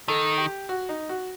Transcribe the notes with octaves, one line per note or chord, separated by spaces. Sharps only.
D#3 A4
G4
F#4
D#4
F#4